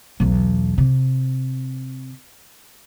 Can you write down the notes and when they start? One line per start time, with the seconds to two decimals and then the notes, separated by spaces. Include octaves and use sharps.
0.20 B1 E2
0.78 C3